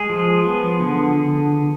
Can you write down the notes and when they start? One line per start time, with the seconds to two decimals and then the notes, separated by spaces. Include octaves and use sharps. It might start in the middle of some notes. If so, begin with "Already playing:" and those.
Already playing: G#3 G#4
0.09 F3
0.45 B3
0.80 D3